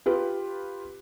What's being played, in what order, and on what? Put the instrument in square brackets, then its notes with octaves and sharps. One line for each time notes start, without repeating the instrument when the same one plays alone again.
[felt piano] F4 G4 B4